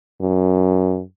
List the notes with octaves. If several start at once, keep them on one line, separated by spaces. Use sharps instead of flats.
F#2